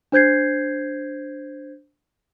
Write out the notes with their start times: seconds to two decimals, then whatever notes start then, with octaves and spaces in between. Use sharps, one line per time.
0.12 D4 C5 G6 G#6 C7